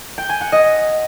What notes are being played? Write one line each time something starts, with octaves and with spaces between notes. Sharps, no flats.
G5
G#5
F#5
D#5